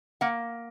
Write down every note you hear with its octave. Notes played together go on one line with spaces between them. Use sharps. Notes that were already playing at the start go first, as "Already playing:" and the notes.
A#3 F#5